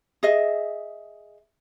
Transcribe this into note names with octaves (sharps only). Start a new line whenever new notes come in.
G#4 D#5 E5